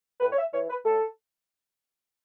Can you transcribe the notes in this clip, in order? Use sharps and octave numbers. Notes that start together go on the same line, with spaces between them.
A2 B4
C#5
E5
E3 C#5
B4
A2 A4